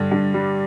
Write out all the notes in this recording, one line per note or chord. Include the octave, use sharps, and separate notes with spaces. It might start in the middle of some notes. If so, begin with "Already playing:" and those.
Already playing: G2 D3
G2
G3